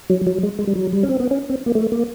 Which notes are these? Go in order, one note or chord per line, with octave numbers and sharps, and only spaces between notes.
F#3
F#3
G#3
G#3
G3
F#3
G3
C#4
C4
B3
C#4
C4
A#3
A3
A#3